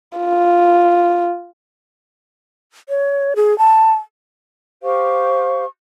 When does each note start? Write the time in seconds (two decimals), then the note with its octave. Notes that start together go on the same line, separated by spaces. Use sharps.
0.18 F4
2.89 C#5
3.36 G#4
3.58 A5
4.82 G4 C5 F5 C#6